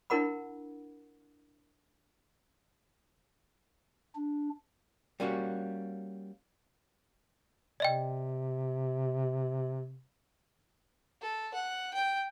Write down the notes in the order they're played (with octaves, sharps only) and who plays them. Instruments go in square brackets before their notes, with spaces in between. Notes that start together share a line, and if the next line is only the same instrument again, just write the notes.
[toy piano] D4 E4 A#4 F#5 B5
[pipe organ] D4
[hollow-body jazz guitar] G3 A#3 C#4 F#4
[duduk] C3 [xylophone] D5 D#5 G5
[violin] A4
F#5
G5